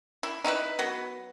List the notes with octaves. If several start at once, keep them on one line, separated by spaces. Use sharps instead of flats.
E4
D#4 E4 F#4 B4
F#3 B3